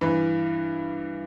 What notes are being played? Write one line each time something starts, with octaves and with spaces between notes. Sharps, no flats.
G2 E3 B4